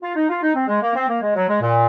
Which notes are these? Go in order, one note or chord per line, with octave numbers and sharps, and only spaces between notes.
F4
D#4
F4
D#4
C4
G#3
A#3
C4
A#3
G#3
F#3
G#3
A#2